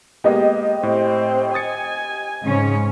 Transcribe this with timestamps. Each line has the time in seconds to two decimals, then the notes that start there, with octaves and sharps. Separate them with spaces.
0.24 G#3 A#3 B3 G4 D#5
0.83 A2 C4
1.54 G#5 D#6 A6 C#7
2.44 G#2 C#3 C#4